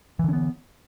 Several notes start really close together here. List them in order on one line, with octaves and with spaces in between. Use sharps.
E3 D3 C#4 B3